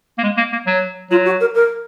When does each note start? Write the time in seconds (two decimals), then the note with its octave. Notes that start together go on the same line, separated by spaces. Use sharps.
0.18 A#3
0.23 G#3
0.37 A#3
0.52 A#3
0.67 F#3
1.11 F#3 F4
1.25 F#4
1.40 A#4
1.55 A#4